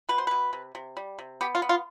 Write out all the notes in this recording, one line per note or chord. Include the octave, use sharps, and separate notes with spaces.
B2 B4
C5
B2 B4
C3
C3
G3
C3
B3 G4
F4
B3
F4